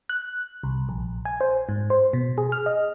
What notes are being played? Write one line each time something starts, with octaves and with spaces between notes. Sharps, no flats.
F#6
C2
A#1
G#5
C5
G#2
C5
B2
G#4
F6
D#5